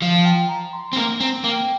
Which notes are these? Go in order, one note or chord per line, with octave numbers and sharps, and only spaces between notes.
F3 F5
G5
A#5
C6
C4
A#3 A#5
C4
A#3 G5